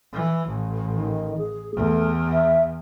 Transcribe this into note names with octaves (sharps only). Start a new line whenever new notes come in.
E3
A1
D#3
G#4
E2 A3
E5